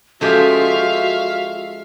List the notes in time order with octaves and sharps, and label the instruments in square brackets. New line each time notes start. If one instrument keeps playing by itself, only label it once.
[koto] F3 G#3 G4 [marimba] C#4 A4 [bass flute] F#4 [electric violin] E5 F5